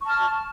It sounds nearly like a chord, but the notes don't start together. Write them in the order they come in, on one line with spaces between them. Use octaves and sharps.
C#6 A5 F6